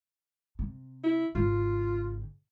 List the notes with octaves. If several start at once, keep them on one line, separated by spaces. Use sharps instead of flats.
C3
E4
G#1 C#3 F4